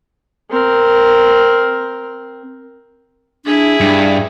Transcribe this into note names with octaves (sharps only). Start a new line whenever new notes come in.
C4 A#4
D4 E4 G#4
G2 D4